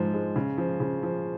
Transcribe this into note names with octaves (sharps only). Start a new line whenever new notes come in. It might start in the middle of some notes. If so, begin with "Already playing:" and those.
Already playing: G#2 F3 G#3
G#3
C#3
F3
C#3
F3